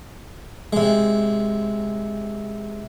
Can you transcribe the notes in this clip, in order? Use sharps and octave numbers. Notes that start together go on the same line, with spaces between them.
C3 G#3